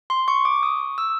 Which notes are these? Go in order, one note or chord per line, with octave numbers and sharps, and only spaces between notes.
C6
C#6
D6
D#6
E6